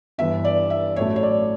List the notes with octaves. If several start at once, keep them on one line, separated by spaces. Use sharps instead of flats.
G1 G2 E3 E5
D5
E5
A1 A2 F#3 A3 C#5
C#5
D5